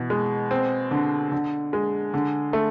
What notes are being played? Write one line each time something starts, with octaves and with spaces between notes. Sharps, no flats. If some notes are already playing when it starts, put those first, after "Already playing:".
Already playing: B2 E3
G#3
C4
D3
D3
G#3
D3
A3